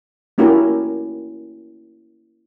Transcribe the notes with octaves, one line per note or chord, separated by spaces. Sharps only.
A#3 C#4 E4 F#4 G4 A#4